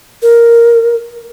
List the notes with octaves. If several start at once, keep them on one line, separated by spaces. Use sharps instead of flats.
A#4